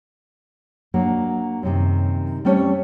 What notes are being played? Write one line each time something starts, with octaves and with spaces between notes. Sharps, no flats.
F#3 A#3 D4 D#5
F#2 C3 D#3
G3 A3 C4 C#4 C#5